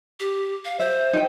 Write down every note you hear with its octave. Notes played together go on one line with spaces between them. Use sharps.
G4
F5
C5 E5
D#4 A4 G5